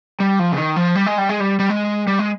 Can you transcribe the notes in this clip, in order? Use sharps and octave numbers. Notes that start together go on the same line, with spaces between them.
G3
F3
C#3
D#3
F3
G3
G#3
G3
G#3
G3
G3
G#3
G3
G#3